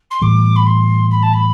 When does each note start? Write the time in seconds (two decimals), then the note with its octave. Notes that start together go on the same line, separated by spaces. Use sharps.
0.10 C6
0.22 A2 E3 G3 D6
0.55 B5
0.66 C6
1.10 B5
1.22 A5
1.32 B5